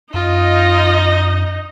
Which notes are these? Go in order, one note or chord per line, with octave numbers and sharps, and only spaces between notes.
F#2 D#4 F4 D#5